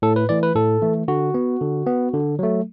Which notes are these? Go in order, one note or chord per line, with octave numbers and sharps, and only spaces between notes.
A2 A4
B4
E3 A3 D5
B4
A2 A4
E3 A3
D3 F#4
B3
D3
B3
D3
F#3 A3